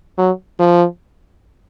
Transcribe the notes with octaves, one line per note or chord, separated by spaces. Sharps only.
F#3
F3